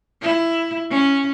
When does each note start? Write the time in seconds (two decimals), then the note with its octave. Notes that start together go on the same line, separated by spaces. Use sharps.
0.22 E4
0.90 C#4